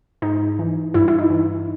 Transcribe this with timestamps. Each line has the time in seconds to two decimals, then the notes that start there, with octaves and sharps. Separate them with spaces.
0.22 G#2 D#4
0.59 E3
0.94 G2 E4
1.08 E4
1.19 D#4
1.30 E3